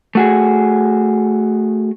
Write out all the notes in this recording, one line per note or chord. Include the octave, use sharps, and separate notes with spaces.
A3 F#4 G#4